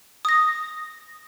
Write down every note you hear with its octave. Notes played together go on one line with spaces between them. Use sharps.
D#6 A#6